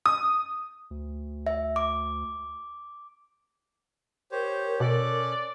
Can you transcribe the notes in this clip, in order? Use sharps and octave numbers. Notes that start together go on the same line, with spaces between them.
D#6
D2
E5
D6
G4 A#4 C5 C#5
B2 C#4 A4 D5 F#6